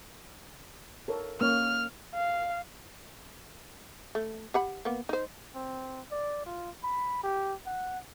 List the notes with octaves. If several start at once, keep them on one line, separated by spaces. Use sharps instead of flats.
A4 A#4 C#5
A#3 C#4 C#5 F6
F5
A3
G4 F#5 B5
A#3 B3
D#4 C5
C4
D5
F4
B5
G4
F#5